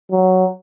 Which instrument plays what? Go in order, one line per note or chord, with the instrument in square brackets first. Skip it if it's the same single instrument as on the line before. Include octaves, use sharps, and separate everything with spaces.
[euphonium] F#3